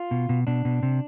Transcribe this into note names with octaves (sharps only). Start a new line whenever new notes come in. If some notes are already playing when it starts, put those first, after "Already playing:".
Already playing: F4
B2
B2
B2 D4
B2
C3